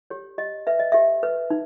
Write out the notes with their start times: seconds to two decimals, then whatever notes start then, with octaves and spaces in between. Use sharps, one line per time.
0.10 G4 C#5
0.38 G4 D#5
0.67 B4 E5
0.79 D#5
0.92 G4 E5
1.23 B4
1.50 D#4